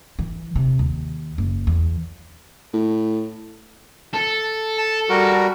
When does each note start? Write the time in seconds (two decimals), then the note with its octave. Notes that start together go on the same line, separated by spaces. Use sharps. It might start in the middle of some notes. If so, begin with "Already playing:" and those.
0.19 E3
0.56 C3
0.79 D#2
1.38 F#1
1.67 E2
2.73 A2
4.14 A4
4.78 A5
5.09 G3 F#4 A#4